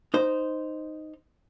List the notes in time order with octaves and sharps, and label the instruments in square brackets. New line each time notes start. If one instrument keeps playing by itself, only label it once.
[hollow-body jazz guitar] D#4 C5